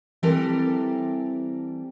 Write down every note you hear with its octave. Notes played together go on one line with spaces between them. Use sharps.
E3 G3 C4 G4 A4 A#4